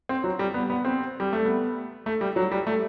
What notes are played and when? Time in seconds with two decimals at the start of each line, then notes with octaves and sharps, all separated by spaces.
0.09 C4
0.24 F#3
0.39 G3
0.54 B3
0.70 B3
0.85 C4
1.20 G3
1.33 A3
1.45 B3
2.06 A3
2.21 G3
2.36 F#3
2.52 G3
2.67 A3